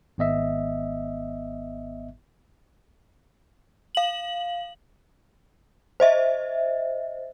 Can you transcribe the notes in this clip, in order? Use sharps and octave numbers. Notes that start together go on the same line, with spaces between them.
G#1 B3 D#5 E5
F5 F#7
C5 D#5 E5